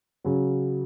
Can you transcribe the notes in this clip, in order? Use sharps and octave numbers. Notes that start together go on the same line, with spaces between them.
C#3 F#3